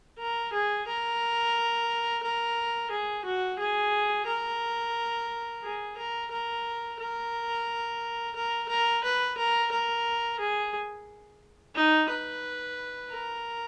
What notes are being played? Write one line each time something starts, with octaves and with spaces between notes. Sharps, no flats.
A#4
G#4
A#4
A#4
G#4
F#4
G#4
A#4
G#4
A#4
A#4
A#4
A#4
A#4
B4
A#4
A#4
G#4
D#4
B4
A#4